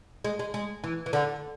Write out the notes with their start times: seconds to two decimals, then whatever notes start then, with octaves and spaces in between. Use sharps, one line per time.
0.24 G#3
0.39 G#3
0.54 G#3
0.84 E3
1.06 E3
1.13 D3